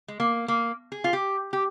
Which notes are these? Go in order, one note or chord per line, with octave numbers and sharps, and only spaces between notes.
G#3
A#3
A#3
G#4
F4
G4
G4